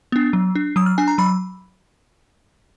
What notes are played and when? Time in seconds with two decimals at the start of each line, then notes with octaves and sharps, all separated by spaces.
0.12 B3 D4
0.33 F#3
0.55 D4
0.76 F#3 D#6
0.86 F6
0.98 D4 G#5
1.08 A#5
1.18 F#3 B5